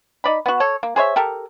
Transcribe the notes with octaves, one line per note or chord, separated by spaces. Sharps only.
D#4 D5 B5
B3 F#4
A4 C#5
A#3
G#4 C5 C#5 E5
G4 A4 A#4